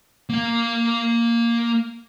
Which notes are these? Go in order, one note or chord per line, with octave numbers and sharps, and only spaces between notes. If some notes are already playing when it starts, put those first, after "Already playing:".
A#3 F5